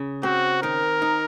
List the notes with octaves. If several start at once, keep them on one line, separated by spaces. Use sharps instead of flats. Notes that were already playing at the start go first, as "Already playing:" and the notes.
Already playing: C#3
C4 F#4
D#3 A#4
D#4